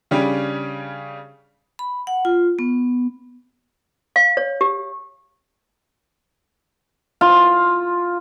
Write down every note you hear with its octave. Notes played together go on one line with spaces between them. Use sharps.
C#3 G3 C#4 D4
B5
F#5
F4
B3
F5
C#5
G4
F4